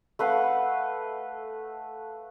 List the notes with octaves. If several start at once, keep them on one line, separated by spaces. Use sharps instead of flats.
A3 B4 F5 F#5